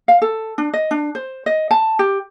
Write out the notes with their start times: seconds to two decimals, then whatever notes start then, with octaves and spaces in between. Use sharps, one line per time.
0.08 F5
0.22 A4
0.58 D4
0.73 D#5
0.91 D4
1.15 C5
1.46 D#5
1.71 A5
1.99 G4